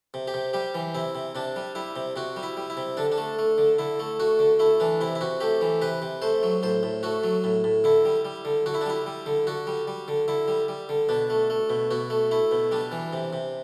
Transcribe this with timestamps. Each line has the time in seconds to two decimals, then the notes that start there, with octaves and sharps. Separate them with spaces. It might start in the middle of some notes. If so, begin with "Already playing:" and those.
0.14 C3
0.28 G4
0.34 C3
0.53 G3 G4
0.74 E3
0.95 C3 E4
1.15 C3
1.35 C3 D4
1.56 G3
1.75 G3 E4
1.96 C3
2.16 C3 F#4
2.36 G3
2.43 E4
2.57 G3
2.70 E4
2.77 C3
2.97 D3 D4
3.12 D4
3.18 A3
3.39 A3
3.58 D3
3.78 D3 E4
4.00 A3
4.20 A3 F#4
4.39 D3
4.59 A3 E4
4.80 E3 D4
5.01 C3 E4
5.15 E4
5.21 C3 F#4
5.40 A3 G4
5.61 E3
5.81 C3 B4
6.02 C3
6.22 A3 C5
6.43 F#3
6.63 A2 C5
6.83 A2
7.03 A3 F#4
7.24 F#3
7.44 A2
7.64 A2
7.84 D3 E4
8.05 G3
8.25 G3
8.45 D3
8.66 D3 F#4
8.74 E4
8.81 D4
8.86 G3 E4
9.06 G3
9.26 D3
9.47 D3 F#4
9.67 G3
9.87 G3
10.08 D3
10.28 D3 E4
10.48 G3
10.68 G3
10.89 D3
11.09 B2 D4
11.30 A3
11.50 A3
11.70 B2
11.91 B2 F#4
12.10 A3
12.31 A3 E4
12.51 B2
12.71 G3 D4
12.92 E3
13.13 C3
13.33 C3